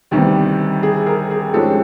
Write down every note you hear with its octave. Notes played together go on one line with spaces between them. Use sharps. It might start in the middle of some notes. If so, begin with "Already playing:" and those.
D2 C3 D#3 G3 B3 G4
G#4
G#4 A#4
G#4
G#2 F3 G#3 C#4 G4 A4